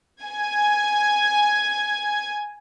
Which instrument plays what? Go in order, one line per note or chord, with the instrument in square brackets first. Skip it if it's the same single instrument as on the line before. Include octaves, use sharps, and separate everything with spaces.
[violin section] G#5 G#6